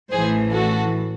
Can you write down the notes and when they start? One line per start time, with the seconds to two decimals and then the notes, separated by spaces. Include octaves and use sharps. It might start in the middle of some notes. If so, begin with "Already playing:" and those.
0.12 A1 A2 E3 G#4 C5
0.52 F#4 A4